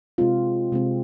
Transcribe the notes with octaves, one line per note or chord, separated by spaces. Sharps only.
C3 G#3 C4 F4
C3 G#3 C4